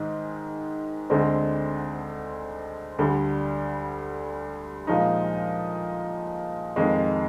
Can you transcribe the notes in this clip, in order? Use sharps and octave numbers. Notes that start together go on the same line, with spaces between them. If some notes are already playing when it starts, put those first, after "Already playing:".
Already playing: G#2 D#3 G#3
D2 D3 G#3 C4
D2 D3 G3
A#2 F3 G#3 D#4
F2 D#3 G#3